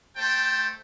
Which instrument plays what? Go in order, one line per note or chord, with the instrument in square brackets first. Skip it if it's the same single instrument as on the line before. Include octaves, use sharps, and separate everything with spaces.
[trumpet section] A3 C5 G5 A5